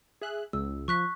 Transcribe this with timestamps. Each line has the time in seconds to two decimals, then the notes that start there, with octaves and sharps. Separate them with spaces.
0.21 G#4 E5 F#6
0.53 C#2 E6
0.88 F3 C#6 F#6 B6